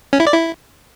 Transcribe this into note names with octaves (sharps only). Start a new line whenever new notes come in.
C#4
E4
D5
E4